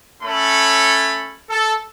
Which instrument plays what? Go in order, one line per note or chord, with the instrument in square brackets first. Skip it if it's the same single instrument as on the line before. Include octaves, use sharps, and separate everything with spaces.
[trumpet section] A3 C#4 A4 C#5 B5
A4